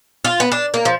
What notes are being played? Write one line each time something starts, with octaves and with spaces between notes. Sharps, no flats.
F4
B3
D4
A#3
F3